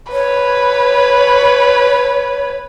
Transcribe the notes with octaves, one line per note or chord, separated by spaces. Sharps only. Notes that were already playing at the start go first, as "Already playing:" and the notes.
B4 C#5